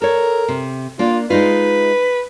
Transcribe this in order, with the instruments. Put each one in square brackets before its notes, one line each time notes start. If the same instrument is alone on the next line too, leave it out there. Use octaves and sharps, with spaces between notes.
[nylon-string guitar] A4 C#5 [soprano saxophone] A#4
[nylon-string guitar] C3
[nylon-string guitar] A#3 D4 [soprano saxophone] F4
[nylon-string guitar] G#3 D#4 F4 [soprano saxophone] B4